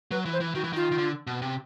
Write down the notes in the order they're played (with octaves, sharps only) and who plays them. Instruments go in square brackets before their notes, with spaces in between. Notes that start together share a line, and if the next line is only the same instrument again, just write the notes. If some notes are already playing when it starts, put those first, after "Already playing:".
[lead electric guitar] F#3 [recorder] B4
[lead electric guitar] E3
[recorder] C5
[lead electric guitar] E3
[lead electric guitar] D#3 [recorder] F#4
[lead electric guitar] E3
[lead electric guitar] D#3 [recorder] F4
[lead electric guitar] D#3
D3
B2
C3